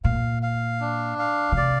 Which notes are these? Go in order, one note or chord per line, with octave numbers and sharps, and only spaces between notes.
A#2 F5
F5
D4
F5
D3
C3 D5